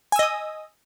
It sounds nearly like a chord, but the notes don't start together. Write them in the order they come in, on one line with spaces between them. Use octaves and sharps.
G#5 E6 D#5 D#6